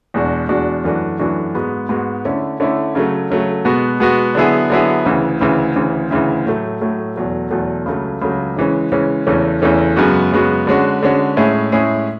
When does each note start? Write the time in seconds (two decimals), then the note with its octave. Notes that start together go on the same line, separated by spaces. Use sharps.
0.14 E2 B2 G#3 D4 F#4
0.49 E2 B2 G#3 D4 F#4
0.84 F#2 E3 A3 D4 F#4
1.19 F#2 E3 A3 D4 F#4
1.55 G#2 G#3 B3 F#4
1.89 G#2 G#3 B3 F#4
2.25 D3 A3 C#4 E4
2.60 D3 A3 C#4 E4
2.95 C#3 F#3 A3
3.30 C#3 F#3 A3
3.65 B2 G#3 B3 F#4
4.00 B2 G#3 B3 F#4
4.35 D3 F#3 B3 E4 G#4
4.70 D3 F#3 B3 E4 G#4
5.05 D2 C#3 E3
5.41 D2 C#3 E3
5.76 D2 C#3 E3
6.11 D2 C#3 E3
6.46 A2 F#3 A3
6.81 A2 F#3 A3
7.16 E2 B2 F#3 A3
7.51 E2 B2 F#3 A3
7.86 C#2 C#3 F#3 A3
8.22 C#2 C#3 F#3 A3
8.56 C#3 E3 G#3 C#4
8.92 C#3 E3 G#3 C#4
9.27 E2 C#3 E3 A3 C#4
9.62 E2 C#3 E3 A3 C#4
9.96 F#2 C#3 G#3 B3 F#4
10.32 F#2 C#3 G#3 B3 F#4
10.67 D3 G#3 C#4 F#4
11.02 D3 G#3 C#4 F#4
11.37 A2 G#3 C#4 E4 G#4
11.72 A2 G#3 C#4 E4 G#4